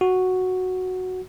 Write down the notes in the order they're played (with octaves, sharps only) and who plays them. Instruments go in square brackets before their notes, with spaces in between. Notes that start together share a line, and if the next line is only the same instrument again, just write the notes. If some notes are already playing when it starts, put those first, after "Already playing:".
[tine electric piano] F#4